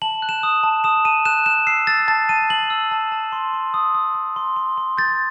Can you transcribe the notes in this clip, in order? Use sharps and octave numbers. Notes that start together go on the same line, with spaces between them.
A5 F#7
F#6
E7
D#6
A5
D#6 E7
A5 D#7
F#6 E7
F#6 E7
E6 C7
E6 A6
A5 A6
A5 D#7
A5 F#7
E6
A5
A5
C6
C6
D#6
D#6
D#6
C6
C6
C6
G6 A6